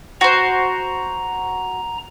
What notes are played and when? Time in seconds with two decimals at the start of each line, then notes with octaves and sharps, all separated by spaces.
0.21 F#4 C5 A#5